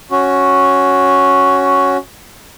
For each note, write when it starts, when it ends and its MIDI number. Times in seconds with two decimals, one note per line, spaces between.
0.11 1.97 61
0.11 1.97 66